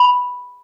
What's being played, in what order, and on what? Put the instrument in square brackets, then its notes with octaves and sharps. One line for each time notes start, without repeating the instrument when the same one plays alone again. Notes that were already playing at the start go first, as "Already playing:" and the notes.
Already playing: [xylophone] B5